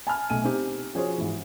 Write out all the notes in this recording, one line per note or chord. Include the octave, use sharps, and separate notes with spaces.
G#5 A5 B5 F6
B1 A3 G#5 D#7
C4 D#4 G4
F3 C#4 F#4 G#4 C5 C#5
G#2 E3